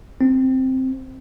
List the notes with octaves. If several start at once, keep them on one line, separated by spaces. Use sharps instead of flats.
C4